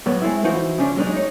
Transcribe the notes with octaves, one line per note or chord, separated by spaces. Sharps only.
A2 F#3 B3 C#5
G#3 A3 C4 E4
E3 F3 D#4 E4 F#4 C5
C#3 F3 C#4 D4
A2 F#3 G#3 C4 D4 D#4
D#4 C#5